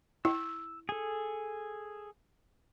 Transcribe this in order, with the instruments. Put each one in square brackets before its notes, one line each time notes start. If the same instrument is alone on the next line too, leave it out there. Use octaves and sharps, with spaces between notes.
[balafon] E4 [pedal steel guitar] E6
[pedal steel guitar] G#4 A4